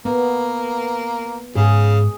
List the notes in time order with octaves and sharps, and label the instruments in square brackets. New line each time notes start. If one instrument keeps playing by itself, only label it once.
[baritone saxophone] A#3 [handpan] B3
[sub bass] G#2 [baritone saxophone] C#3 [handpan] G#4